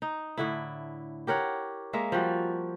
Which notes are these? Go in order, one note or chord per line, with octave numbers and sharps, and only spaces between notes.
D#4
A2 D3 E4
G4 A#4 C#5 F#5
G#3 A#3 E5
F3 G3 F#4